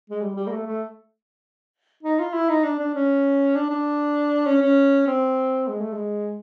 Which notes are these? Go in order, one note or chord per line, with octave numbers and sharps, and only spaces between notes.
G#3
G3
G3
A#3
A3
A3
D#4
F4
E4
D#4
D4
D4
C#4
D4
D4
C#4
C#4
C4
G#3
A3
G#3